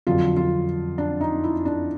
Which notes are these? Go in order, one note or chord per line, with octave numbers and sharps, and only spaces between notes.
F2 D3 F#3 F4
F4
D4
D#4
E4
D4